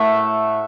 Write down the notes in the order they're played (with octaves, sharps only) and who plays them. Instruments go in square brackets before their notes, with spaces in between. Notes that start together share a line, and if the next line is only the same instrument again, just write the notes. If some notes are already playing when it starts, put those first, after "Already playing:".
Already playing: [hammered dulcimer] A2 A3 E5 F#5